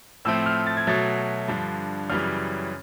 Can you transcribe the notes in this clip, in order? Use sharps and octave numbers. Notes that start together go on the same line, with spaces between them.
A2 F3 A3 C4 E6
F6
A6
G#6
B2 F#3 A3 A6
G2 D3 F3
F#2 C#3 E3 G3 F6